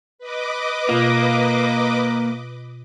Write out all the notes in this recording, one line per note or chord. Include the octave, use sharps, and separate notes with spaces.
B4 D#5 D6
B2 A#3 F4